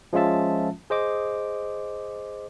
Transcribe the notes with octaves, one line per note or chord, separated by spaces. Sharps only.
F3 G#3 C#4 F4 E5 A5
G#4 C5 D#5 D6